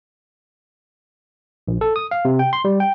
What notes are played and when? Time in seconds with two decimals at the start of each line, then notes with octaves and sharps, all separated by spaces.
1.68 A#1
1.81 A4
1.96 D#6
2.11 F5
2.25 C3
2.39 G5
2.53 C6
2.65 G3
2.80 G5